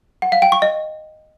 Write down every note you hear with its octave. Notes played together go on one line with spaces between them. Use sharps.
F#5
F5
G5
C#6
D#5